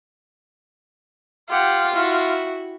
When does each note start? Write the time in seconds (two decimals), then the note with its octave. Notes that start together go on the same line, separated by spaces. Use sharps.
1.49 F4 G4 F#5
1.93 E4 F#4